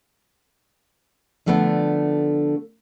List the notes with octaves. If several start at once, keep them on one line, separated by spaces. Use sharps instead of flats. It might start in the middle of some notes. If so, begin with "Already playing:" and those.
D3 F3 A3 B3 C#4 D4